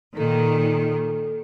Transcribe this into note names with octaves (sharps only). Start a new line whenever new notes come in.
A#2 D#3 A4